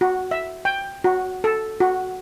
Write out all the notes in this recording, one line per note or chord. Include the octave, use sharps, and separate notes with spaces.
F#4
E5
G5
F#4
A4
F#4